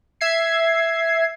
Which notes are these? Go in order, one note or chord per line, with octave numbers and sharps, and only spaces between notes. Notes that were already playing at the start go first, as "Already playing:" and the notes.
E5 G#6 C7